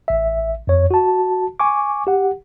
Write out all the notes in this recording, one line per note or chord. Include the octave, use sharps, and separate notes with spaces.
A1 E5
F2 C#5
F#4 A5
G#5 C#6 D6
G4 F#5